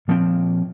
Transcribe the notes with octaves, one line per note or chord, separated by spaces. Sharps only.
A#2 F3 C4